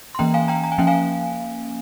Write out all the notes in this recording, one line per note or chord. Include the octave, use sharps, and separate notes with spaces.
C6
E3 A#3 C#4 G5 A#5
F5 G#5
G5 A#5
A#5
G#5
F3 A#3 C#4 G5
F5 G#5